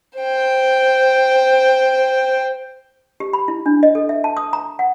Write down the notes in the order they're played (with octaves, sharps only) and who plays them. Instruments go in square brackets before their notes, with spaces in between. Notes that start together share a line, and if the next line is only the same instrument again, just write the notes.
[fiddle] C5 G5
[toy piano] G4
B5
E4
D4
D#5
A4
E5
A5
D#6
A#5
F#5